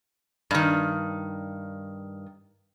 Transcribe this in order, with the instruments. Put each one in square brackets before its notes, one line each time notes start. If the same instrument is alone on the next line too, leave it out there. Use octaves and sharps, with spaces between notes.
[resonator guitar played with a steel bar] G2 D#3